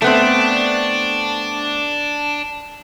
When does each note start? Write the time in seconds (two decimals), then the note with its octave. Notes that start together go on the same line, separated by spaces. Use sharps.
0.02 A3 B3 C4 D4